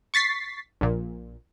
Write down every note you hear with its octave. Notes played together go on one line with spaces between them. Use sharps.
C#6 A6 B6 C7
A#1 A#2